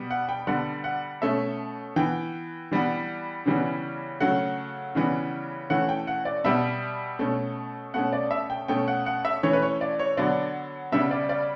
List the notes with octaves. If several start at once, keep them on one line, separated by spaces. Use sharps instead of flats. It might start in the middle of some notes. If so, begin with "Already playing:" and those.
Already playing: B2 G3 B3
F#5
G5
D3 G3 B3 F#5
F#5
B2 A3 C#4 E5
E3 B3 G5
E3 G3 B3
C#3 E3 G3 B3
C#3 F#3 A3 F#5
C#3 E3 G3 B3
E3 A3 C#4 F#5
G5
F#5
D5
B2 G3 B3 E5
B2 A3 C#4
B2 A3 C#4 F#5
D5
E5
G5
B2 A3 C#4 G5
F#5
F#5
E5
E3 A3 C#4 C#5
B4
C#5
D5
C#5
D3 F#3 B3 D5
C#3 G3 B3 E5
D5
D5